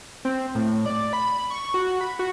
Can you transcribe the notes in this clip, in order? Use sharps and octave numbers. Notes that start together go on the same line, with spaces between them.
C4
A2
D5
B5
C#6
F#4
B5
F#4